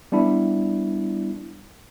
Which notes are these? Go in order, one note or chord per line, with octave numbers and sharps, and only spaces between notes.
G3 B3 D4 E4